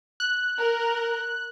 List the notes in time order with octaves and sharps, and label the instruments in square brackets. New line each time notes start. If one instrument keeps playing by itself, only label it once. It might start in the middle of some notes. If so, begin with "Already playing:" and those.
[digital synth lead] F#6
[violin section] A#4